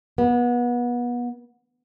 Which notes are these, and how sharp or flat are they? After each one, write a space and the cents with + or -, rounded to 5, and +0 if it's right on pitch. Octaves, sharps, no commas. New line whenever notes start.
B3 -30